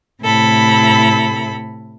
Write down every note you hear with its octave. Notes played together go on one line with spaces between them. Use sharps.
A2 C3 E4 A4 B5